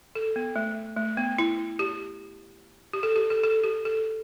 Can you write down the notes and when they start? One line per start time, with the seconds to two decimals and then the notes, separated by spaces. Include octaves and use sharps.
0.15 A4
0.36 B3
0.56 A3
0.97 A3
1.17 B3
1.38 E4
1.79 G4
2.93 G4
3.03 A4
3.16 G4
3.30 A4
3.43 A4
3.64 G4
3.85 A4